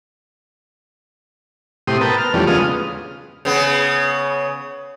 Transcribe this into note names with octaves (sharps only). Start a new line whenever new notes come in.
A2 C3 G4 C6 D#6
B3 A#4 B4 G5 A5
F6
E2 F3 G3 A3 C#4 D4
C#3 G#3 B3 F4 D#6 F6
C#3 B3